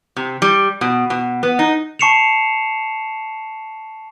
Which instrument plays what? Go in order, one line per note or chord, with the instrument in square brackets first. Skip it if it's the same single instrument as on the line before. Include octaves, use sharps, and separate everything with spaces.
[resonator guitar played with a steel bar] C3
G3
B2
B2
B3
D#4
[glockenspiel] A5 C#6 C7 C#7 E7 F7